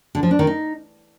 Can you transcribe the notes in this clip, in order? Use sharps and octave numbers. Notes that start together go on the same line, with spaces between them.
D3
F3
D4
D#3
D#4